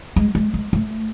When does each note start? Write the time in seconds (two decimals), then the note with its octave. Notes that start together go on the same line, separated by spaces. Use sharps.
0.16 G#3
0.35 G#3
0.54 G#3
0.73 A3